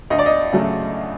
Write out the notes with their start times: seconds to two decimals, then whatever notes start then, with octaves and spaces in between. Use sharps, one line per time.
0.10 D2 D#5
0.19 D5
0.26 D#5
0.53 C#3 F#3 A3